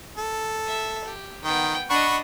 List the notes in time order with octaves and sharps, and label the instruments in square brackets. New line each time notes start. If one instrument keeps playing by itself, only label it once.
[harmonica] A4
[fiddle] E5
G4
[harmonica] D#3 [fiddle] B3 G5
[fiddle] D4 D#5 [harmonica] F#5 B5 C#6